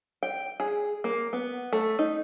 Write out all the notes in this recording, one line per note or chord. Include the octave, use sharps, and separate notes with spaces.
G5
G#4
A#3
B3
A3
D#4